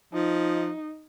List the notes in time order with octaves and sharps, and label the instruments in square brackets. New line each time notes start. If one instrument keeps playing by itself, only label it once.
[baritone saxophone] F3 [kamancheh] D#4